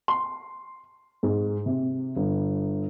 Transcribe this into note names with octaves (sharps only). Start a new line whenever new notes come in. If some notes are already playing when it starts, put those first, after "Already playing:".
C6
G#2
C3
G1